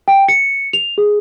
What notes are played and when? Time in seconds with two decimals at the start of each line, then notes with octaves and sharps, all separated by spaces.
0.08 G5
0.28 C#7
0.73 F7
0.98 G#4